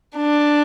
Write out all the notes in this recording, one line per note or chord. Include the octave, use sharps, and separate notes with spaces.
D4